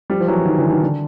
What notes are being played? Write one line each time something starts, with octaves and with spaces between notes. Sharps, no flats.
F3 G3
F3
E3 F#3
D#3
D3 E3
D#3
D3